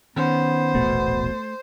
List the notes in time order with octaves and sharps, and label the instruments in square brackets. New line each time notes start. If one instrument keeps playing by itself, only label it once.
[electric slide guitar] D#3 C#4 [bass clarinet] B3 [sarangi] C5
[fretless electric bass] D#1 A1 B2 [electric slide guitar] A3